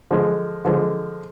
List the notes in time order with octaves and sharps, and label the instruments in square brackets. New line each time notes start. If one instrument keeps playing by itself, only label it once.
[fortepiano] D3 F3 G#3
D3 F3 G#3